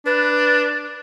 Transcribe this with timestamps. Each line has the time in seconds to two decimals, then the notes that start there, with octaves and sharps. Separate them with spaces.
0.06 D4 B4